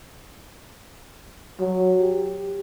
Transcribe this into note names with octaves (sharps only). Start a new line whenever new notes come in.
F#3
G4